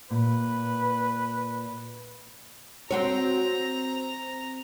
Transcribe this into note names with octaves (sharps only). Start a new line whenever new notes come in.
A#2 B4
C4 F#4 C#5 A#5